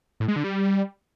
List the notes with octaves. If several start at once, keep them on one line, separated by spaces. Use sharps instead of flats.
A2
G#3
D3
G3